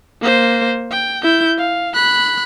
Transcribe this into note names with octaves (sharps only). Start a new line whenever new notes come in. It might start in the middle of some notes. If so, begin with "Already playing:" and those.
A#3 C5
G5
E4 G6
F5
B5 F#6